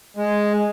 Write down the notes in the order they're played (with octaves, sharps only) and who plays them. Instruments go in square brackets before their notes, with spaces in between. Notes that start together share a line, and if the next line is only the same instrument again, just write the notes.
[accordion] G#3